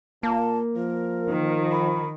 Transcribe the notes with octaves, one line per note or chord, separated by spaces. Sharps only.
A#2 A#3 A5
F3 A#4
D#3
B5